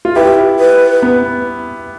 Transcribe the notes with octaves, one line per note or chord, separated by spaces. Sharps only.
F4
E4 G4 B4
B4
B3